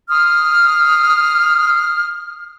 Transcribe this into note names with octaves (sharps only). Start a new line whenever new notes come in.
C6 D#6 F6